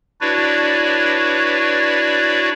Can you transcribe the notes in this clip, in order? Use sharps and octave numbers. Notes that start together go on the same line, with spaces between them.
D4 E4 F#4 B4 C#5 D5